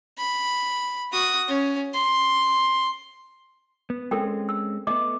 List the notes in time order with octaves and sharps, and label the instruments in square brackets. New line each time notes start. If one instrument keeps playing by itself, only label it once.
[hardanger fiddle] B5
F#4 D#6
C#4
C6
[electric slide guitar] B3
[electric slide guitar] G#3 C4 C#4 [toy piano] A4 A#4 G5
[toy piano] E6
[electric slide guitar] A3 B3 [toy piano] D#5 D6